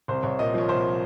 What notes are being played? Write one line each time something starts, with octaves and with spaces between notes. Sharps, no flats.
C2 C5
C2 C#5
A#2 D#5
F3 C#5
C2 C5